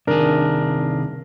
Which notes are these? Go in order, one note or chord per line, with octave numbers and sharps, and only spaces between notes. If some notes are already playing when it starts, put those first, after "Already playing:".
C2 D#3 D4 G#4 A#4